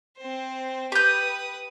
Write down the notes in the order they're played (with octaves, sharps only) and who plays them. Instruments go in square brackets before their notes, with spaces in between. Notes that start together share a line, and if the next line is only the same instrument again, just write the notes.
[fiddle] C4 C5
[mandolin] G4 G6 [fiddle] B4 D#6